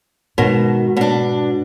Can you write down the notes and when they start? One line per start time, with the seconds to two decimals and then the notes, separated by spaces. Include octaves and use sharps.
0.38 G#2 B2 D#3
0.97 B2 D4